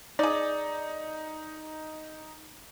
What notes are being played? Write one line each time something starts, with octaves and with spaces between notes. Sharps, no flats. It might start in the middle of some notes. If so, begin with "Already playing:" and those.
D#4 G#4 D5